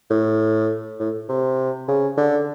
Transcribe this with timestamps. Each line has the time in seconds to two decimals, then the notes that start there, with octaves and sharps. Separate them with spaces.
0.10 A2
0.99 A2
1.29 C3
1.88 C#3
2.17 D3